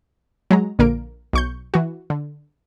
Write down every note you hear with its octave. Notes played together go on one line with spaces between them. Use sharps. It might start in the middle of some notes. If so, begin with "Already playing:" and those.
F#3 G#3 A#5
A#1 D3 A#3 A#4 D7
B1 C#6 G6
E3 F#4
D3